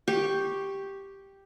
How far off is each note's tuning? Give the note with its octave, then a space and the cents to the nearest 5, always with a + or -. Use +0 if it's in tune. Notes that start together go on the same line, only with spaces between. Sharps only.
G4 +0 C#6 +0